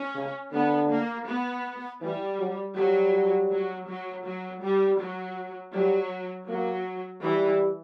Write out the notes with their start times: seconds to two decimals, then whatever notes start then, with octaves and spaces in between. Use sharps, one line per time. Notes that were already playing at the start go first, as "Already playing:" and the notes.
Already playing: C#4
0.15 C#3
0.52 D3 B3
0.90 A#3
1.27 B3
2.01 E3 G3
2.39 F#3
2.76 F#3 G3
3.50 F#3
3.88 F#3
4.25 F#3
4.62 G3
4.99 F#3
5.73 F#3 G3
6.48 F#3 A#3
7.23 E3 G3